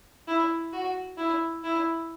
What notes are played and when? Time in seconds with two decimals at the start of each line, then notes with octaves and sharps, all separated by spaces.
0.28 E4
0.72 F#4
1.18 E4
1.63 E4